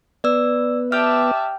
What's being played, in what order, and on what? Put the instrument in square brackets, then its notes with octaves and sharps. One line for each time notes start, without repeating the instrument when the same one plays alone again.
[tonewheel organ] B3 [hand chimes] D5 E6
[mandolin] G4 D5 G5 [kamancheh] E5 A5 [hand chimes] F6